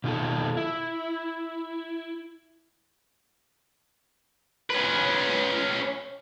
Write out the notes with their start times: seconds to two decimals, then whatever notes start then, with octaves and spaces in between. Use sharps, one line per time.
0.04 B2 D#3 F4 A4
0.57 E4
4.70 C#4 B4